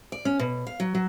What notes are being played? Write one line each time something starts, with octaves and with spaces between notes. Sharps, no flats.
D5
C#4
B2
F5
F#3
F#3